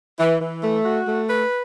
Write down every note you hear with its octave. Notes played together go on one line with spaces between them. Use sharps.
E3
E3
A3
F#4
A3
B4